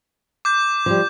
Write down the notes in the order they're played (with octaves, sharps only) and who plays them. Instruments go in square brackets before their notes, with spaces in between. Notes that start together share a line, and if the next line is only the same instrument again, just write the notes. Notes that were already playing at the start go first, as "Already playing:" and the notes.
[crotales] D6 G6
[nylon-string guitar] F3 G3